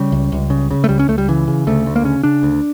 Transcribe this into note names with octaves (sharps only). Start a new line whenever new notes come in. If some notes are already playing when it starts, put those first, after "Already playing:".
Already playing: C#3 G3
C#2
C#2
C#3
C#3
A3
C#2 G3
C#4
C#2 A3
G3
C#3 E3
C#3
D2 A3
D2
A#3
C#3 C#4
C#3 D4
D2